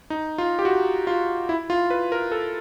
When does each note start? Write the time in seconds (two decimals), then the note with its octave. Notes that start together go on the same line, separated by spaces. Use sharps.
0.10 D#4
0.38 F4
0.59 G4
0.65 F#4
1.07 F4
1.49 E4
1.70 F4
1.90 B4
2.12 A#4
2.32 A4